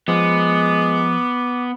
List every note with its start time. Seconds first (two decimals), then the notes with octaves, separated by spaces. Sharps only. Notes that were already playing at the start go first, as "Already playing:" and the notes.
0.08 F3 G#3 B3 D6